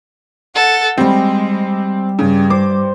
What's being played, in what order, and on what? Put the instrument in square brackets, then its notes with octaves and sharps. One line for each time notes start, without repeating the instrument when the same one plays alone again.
[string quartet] A4 F#5
[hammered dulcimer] G3 G4 [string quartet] G#3 [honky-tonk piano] C4
[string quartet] G2 [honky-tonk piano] C#3
[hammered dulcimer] C5 [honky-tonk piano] D6